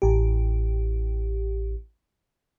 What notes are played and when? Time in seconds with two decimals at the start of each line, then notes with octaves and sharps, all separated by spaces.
0.02 A1 G4